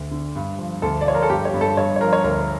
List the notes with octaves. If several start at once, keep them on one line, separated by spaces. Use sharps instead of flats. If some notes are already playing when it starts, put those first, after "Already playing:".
Already playing: D2
D3
G2
F3
D2 A4
D5
F3 C#5
A#4
A4
G2 G4
C#5
G2
A4
G2 C#5
C#5
F3 A#4
C#5
D2 A#4